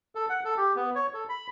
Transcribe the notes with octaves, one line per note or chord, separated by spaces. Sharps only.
A4
F#5
A4
G4
B3
C#5
A4
B5